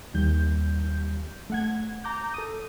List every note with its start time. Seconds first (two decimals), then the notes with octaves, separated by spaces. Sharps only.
0.14 D#2 G3 G6
1.50 A3 F#5 G#6
2.04 A#5 D6 G6
2.34 A4 D#6